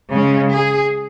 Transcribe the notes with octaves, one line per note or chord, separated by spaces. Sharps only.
C#3 G#3 C#4
G#4